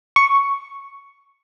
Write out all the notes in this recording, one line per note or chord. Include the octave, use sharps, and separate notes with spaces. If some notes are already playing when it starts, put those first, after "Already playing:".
C#6